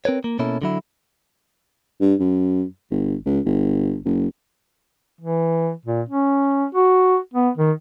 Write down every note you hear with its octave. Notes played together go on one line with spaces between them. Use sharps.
C4 A#4 B4 C#5
A#3
B2 A#3 C#4 E4 A4
D3 F#3 E4
G2
F#2
G1
C#2
G1
F#1
E3
A#2
C#4
F#4
B3
D#3